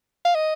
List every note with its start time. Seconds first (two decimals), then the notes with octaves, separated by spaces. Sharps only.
0.25 F5
0.35 D#5